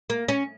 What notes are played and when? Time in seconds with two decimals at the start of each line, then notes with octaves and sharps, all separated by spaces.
0.10 A#3
0.28 C#4